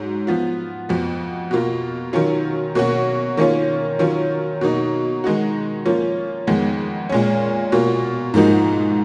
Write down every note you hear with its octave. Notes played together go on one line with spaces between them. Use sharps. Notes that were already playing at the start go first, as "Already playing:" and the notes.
Already playing: G#2 F#3
F3 B3 F4
F2 F3 B3 F#4
B2 A#3 F4
D#3 F#3 C#4 F4
B2 A#3 C#4 F#4
D#3 A#3 C#4 F4
D#3 F#3 C#4 F4
B2 F#3 A#3 D#4
D#3 G#3 D#4 F#4
F3 A#3 C#4 F4
F2 D#3 G#3 B3
A#2 G#3 C#4
B2 A#3 F4
G#2 F3 A#3 D#4 F#4